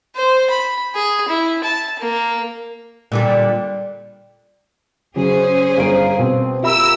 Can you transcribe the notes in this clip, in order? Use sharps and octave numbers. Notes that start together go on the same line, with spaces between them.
C5
B5
G#4
E4
A5
A#3
A#2 D3 G3
C#3 F#3 C#4 G#4 C5
G1 G3 A#4 F5 D7
B2 C4
A#3 F4 G4 A#4 E5 B5 E6